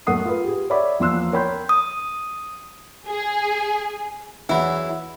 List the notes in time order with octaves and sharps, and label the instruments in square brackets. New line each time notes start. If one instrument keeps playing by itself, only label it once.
[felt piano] F#2 A3 F#5 D#6 C7
F4 B4
G4 G#4
C#5 D5 E5 F#5 B5 D6
E2 F3 A#3 C6 E6 F#6
A#4 C#5 G5 B5 C6 G6
[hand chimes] D#6
[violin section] G#4
[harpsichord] E2 F#3 [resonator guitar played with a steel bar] E4